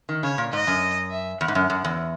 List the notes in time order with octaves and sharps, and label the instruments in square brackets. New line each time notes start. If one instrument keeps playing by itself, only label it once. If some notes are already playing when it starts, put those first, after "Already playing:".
[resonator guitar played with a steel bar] D#3
[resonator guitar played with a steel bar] C#3 [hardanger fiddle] C#5
[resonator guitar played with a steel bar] A#2
[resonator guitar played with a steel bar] G#2 [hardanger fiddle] D#5
[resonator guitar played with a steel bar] F#2
[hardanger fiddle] E5
[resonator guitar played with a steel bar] E2 [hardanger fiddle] F#5
[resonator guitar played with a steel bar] G#2
F#2
F#2
E2